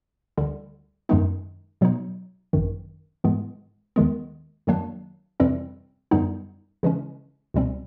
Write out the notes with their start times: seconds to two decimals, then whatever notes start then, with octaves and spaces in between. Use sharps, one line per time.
0.37 D2 D3 G3
1.09 F#2 D#3 G#3 B3 D#4
1.81 B2 F#3 B3 D#4
2.53 G#1 F#2 D#3
3.24 G#2 E3 G#3 B3
3.96 D#2 D#3 G#3 B3
4.67 F#2 D#3 F#3 A#3 D4
5.40 F2 C3 E3 G3 C4
6.11 F#2 D3 G3 B3 D#4
6.83 C#3 E3 G#3 C#4
7.54 C#2 B2 G3 C4